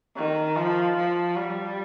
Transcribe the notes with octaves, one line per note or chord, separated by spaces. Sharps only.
D#3
F3
F3
G3